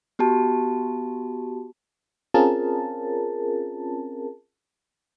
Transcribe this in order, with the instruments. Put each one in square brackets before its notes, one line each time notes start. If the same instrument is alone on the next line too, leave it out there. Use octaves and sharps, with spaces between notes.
[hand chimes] B3 F#4 G4 A5
[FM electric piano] C4 C#4 F4 G#4 A#4 A5